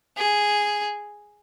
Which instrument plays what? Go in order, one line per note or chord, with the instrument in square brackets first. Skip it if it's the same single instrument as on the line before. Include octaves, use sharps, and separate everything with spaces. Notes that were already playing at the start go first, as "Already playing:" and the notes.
[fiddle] G#4